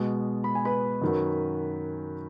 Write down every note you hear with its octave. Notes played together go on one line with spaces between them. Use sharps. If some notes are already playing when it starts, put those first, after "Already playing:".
Already playing: B2 G#3
B5
G#5
B4 B5
F#2 D#3 F#3